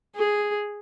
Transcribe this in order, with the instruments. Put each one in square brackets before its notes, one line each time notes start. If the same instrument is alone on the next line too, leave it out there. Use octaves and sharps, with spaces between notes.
[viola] G#4